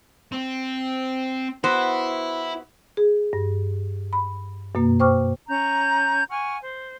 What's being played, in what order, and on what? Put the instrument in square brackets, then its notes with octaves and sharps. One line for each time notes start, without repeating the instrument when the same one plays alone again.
[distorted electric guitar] C4
[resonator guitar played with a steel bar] B3 F#4 C5 [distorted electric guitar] E4
[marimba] G#4
G2
B5
F#2 B2 A#3
C5 G5 C#6 D6 F6
[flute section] C#4 A#5 G6
F#5 G#5 C#6 F6
C5